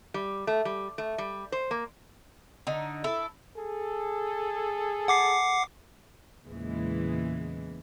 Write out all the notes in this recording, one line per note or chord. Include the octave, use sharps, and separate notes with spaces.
G3
A3
G3
A3
G3
C5
A#3
D3 D#4
E4 A4
G#4 A4
F#5 D6 C7
E2 A#2 C#3 E3 G#3